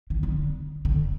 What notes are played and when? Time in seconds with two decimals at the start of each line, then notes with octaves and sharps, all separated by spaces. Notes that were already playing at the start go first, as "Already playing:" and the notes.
0.10 D#3
0.23 D3
0.85 D3